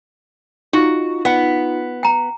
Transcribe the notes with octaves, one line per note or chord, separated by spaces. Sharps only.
D#4 F4 F#4
B3 F#5
G5 A#5